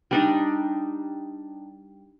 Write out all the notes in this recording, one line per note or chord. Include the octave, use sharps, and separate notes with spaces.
G3 D4 D#4